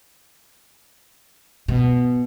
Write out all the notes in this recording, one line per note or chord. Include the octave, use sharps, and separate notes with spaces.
B2